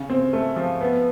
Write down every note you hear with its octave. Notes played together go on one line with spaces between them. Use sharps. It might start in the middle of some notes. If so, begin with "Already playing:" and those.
Already playing: C#3
C4
A3
F3
B3